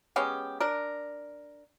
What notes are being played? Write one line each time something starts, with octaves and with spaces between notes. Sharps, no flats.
G#3 B3 C#4 G4
D4 A#4